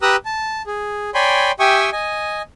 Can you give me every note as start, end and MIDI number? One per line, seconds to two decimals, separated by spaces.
0.02 0.16 67
0.02 0.16 71
0.02 0.16 82
0.02 0.16 87
0.02 0.16 88
0.02 0.16 90
0.25 0.62 81
0.67 1.10 68
1.14 1.51 73
1.14 1.51 74
1.14 1.51 79
1.14 1.51 80
1.14 1.51 83
1.14 1.51 84
1.59 1.90 67
1.59 1.90 76
1.59 1.90 79
1.59 1.90 80
1.59 1.90 85
1.59 1.90 87
1.92 2.42 75
1.92 2.42 80